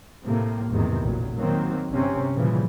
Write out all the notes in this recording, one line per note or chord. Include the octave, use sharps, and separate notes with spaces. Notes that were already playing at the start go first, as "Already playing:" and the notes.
A2 C3 A#3
A1 E2 G#2 C3 D#3
A1 A#2 F#3
D#3 F#3 A#3 C4
G1 C3 C4 C#4
A#2 C#3 E3 F3 G3